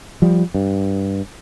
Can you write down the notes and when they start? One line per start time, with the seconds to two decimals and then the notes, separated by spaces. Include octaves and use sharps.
0.22 F3 G3
0.54 G2